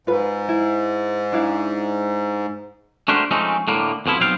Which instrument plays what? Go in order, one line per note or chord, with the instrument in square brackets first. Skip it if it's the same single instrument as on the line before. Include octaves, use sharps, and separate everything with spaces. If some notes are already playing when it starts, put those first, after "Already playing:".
[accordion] G#2 [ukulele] F4 B4
[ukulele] E4
D4 E4 F5
[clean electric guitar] A3 D4 F#4 G4 A#4 C5
F3 G#3 A3 C4 C#4 D#4
A2 D3 A#3
F2 B2 F3 E4
B1 F#3 B3 C4 F5 G5